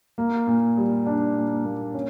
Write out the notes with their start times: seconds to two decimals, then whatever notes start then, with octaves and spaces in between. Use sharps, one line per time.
0.18 A#3
0.47 A#2
0.77 G3
1.06 D4
1.36 A#2
1.65 A#3
1.94 C#4